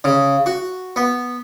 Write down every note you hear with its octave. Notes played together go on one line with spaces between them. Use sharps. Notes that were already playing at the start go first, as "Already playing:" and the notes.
C#3
F#4
B3